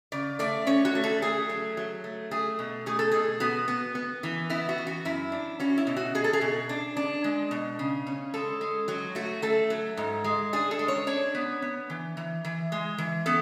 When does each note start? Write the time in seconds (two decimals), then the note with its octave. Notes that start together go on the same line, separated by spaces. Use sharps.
0.12 C#3 D5
0.39 A3 D5
0.67 C#4 C#5
0.85 F#4
0.95 A3
1.04 A4
1.22 A3 G#4
1.50 F#3
1.77 F#3
2.04 A3
2.31 A3 G#4
2.59 B2
2.86 A3 G#4
2.99 A4
3.12 B2 G#4
3.40 B3 F#4
3.68 B3
3.95 B3
4.23 E3
4.50 B3 E4
4.69 F#4
4.78 E3
4.87 F#4
5.05 F#2 E4
5.32 D4
5.60 C#4 F#4
5.78 E4
5.87 B2
5.97 F#4
6.15 B2 G#4
6.24 A4
6.33 G#4
6.41 B2
6.69 D4
6.97 D4
7.24 G#3
7.51 B2
7.79 C#3
8.07 C#4
8.34 G#3 A4
8.61 G#3
8.88 F#3 F#4
9.15 A3 F#4
9.42 A3 A4
9.70 F#3
9.97 G#2
10.24 G#3
10.53 D4 G#4
10.71 A4
10.79 G#3
10.88 C#5
11.07 D4 C#5
11.35 B3
11.62 B3
11.90 E3
12.17 E3
12.45 E3
12.72 G#3
12.98 E3
13.26 B3 A4